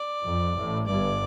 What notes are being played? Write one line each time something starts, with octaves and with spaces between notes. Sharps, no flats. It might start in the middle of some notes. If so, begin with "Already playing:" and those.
Already playing: D5
F2
A1 A2
G1 G2 D5